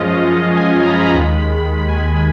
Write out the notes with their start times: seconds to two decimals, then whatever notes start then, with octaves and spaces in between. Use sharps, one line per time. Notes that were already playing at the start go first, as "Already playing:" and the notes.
Already playing: F#2 F3 G#3 C#4 F4 D#5
0.57 G#5
0.83 A#5
0.88 B5
1.02 A#5
1.14 D#2 D#3 G#3 B5
1.88 G#5